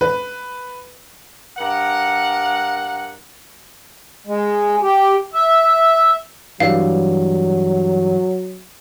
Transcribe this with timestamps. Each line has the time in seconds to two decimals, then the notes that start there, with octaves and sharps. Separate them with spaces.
0.01 B4
1.58 G2 A#4 F#5
4.27 G#3
4.82 G4
5.34 E5
6.60 G2 E3 F#3 G3 F5